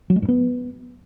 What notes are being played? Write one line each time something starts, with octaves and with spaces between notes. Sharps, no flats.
F#3
G#3
G2
B3